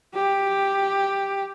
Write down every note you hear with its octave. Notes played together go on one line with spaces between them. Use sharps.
G4